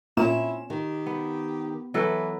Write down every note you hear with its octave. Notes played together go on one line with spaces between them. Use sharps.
A#2 C4 C#4 E4 E7
D#3 G4
B3
E3 F#3 A4 B4